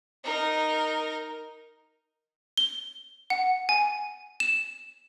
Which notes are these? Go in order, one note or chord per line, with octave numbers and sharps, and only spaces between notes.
D#4 A#4
G7
F#5
G#5
E7